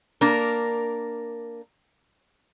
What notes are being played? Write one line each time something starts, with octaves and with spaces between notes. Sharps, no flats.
A#3 D4 A#4